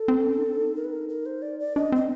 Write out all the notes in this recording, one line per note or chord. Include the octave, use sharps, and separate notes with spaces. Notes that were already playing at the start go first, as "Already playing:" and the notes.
Already playing: A4
C4
C#4
D#4
D4
D#4
A#4
B4
A#4
A#4
C5
D5
D5
D4 D#5
C4 D#5